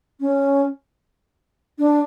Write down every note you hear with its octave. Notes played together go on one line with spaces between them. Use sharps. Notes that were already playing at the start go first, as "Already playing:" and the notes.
C#4
D4